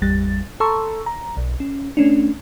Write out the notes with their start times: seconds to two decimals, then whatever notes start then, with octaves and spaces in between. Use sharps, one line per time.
0.02 G#1 E2 G3 A6
0.60 A4 A5 A#5 C6 C#6 E6
1.06 A#5
1.37 B1
1.60 C#4
1.97 A3 C#4 D4